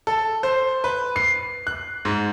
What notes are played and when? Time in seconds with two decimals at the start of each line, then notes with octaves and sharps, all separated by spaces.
0.07 A4
0.43 C5
0.84 B4
1.16 C7
1.67 F#6
2.05 G#2